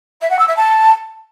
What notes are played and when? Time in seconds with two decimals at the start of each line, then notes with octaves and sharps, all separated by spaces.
0.21 E5
0.30 F#5
0.39 E6
0.47 E5
0.56 A5